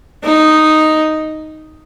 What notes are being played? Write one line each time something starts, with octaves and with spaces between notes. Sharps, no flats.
D#4